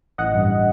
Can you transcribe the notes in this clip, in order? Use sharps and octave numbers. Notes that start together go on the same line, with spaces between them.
A1 D#5 F#5
G2